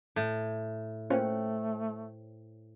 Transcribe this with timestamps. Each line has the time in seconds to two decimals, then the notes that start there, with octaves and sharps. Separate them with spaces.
0.16 A2
1.10 A3 A#3 C#4 F4 C5 C#5 G5